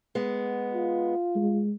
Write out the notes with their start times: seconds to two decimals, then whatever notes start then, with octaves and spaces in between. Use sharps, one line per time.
0.15 G#3 B3
0.73 F4
1.35 G#3